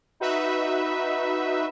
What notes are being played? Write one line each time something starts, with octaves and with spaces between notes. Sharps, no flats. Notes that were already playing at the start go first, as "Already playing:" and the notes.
D#4 F#4 B4 E5